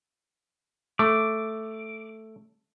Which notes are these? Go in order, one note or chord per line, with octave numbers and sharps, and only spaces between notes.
A3 D6